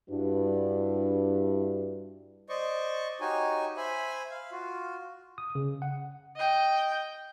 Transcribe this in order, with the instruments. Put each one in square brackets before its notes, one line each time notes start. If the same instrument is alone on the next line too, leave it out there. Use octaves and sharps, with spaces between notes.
[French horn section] G2 G3 D4 E4 F#4 B4
[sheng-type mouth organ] C5 D5 D#5 C#6
D#4 F#4 G4 C#5 G#5
C5 E5 G#5 B5
F5
F4 F#4
[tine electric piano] D#6
C#3
F#5
[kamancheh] D#5 G5